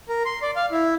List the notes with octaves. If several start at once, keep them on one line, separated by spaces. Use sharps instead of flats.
A#4
C6
D5
F5
E4